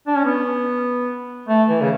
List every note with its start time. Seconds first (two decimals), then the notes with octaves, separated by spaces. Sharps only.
0.07 D4
0.16 C#4
0.25 B3
1.48 A3
1.69 E3
1.81 C#3